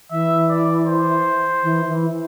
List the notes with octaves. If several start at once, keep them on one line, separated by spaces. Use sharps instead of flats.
E3 E5
D5
C5
E3
E3